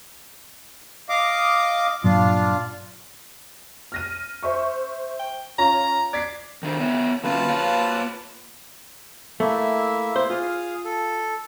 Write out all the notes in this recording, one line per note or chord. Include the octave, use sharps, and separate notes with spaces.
D#5 F5 D6
G2 A#2 F#3 D4 F4
F6 A#6 D#7
C5 E5 C#6
G5
C#4 F4 C#5 A#5
D5 G#6 B6 C7
D#3 D4 C5
B3 C#5 E5
D3 A#3 C#4 F4 B4 A5
A#3 C#5 F5
A3 A#3 E4 E5
C5
F4 G#4 F5 D#6
A4